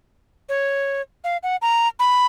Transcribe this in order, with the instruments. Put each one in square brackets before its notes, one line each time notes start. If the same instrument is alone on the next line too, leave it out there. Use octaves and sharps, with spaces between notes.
[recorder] C#5
F5
F#5
A#5
B5